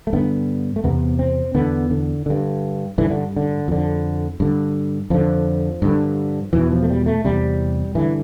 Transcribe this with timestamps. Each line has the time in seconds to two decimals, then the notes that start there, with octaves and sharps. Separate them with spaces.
0.07 A3
0.13 G2 D3 B3
0.76 A3
0.84 E2 C3 B3
1.19 C4
1.55 E2 D3 B3
1.90 D3
2.26 G2 D3
2.98 G2 D3 E3
3.10 D3
3.36 D3
3.68 F2 D3
4.40 G2 D3
5.10 F2 D3 F3
5.82 G2 D3
6.53 E2 B2 E3
6.72 F3
6.83 A3
6.89 G3
7.06 A3
7.24 E2 C3 G3
7.95 G2 D3 E3